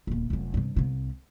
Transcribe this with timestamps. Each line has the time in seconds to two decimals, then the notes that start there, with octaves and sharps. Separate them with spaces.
0.07 D#1 A#1
0.30 F1 F#3
0.54 G2 C3
0.76 C2 C3